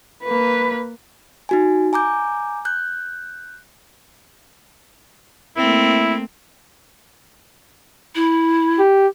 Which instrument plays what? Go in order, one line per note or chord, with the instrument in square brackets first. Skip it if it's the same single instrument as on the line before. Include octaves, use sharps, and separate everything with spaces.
[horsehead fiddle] A#3 B4
[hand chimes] D#4 F#4 G#5
G#5 A#5 D6 G6
F#6 G6
[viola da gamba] A3 A#3 C4 [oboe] E4
[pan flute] E4
[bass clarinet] G4